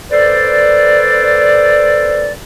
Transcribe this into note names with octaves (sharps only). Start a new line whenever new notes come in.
A4 B4 C5 D5